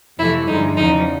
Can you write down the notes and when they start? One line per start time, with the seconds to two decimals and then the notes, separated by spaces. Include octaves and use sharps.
0.19 F2 C3 E3 A3 E4
0.47 G2 D3 F3 G#3 D#4
0.76 E2 C#3 F3 D#4